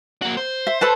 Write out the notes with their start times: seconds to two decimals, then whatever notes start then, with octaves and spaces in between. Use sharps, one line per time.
0.22 A#3 F#4
0.37 C5
0.67 E5
0.81 A4 B4 A5